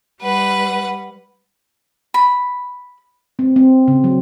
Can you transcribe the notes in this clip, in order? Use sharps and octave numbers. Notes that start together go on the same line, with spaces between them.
G3 B4 F#5
B5
C4
C4
C#3
F#3